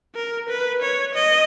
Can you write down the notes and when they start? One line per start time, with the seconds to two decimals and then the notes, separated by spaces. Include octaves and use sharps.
0.15 A#4
0.49 B4
0.82 C#5
1.15 D#5